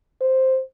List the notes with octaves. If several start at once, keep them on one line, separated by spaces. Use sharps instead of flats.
C5